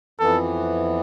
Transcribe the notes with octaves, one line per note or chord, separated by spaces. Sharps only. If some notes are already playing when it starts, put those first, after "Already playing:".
F2 E3 B3 A4